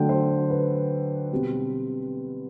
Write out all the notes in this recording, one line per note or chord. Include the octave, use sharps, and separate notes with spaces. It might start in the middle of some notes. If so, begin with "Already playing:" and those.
Already playing: D3 F#3 A3 D4 G5
C5
B4
B2 G3 C4